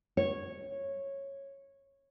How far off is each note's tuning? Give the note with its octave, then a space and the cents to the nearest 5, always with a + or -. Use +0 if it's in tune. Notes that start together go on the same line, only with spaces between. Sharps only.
C#5 -10